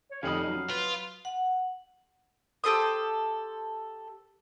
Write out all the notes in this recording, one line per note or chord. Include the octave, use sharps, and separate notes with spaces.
C#5
F1 F2 C#4 D#4 F5 B5 D#6
F#3
F4 B4
F#5
G4 A4 C5 D#6